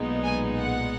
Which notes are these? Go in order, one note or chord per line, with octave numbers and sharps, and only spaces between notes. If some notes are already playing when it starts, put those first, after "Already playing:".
Already playing: B1 A#2 G#3 B3 D#4
G#5
F#5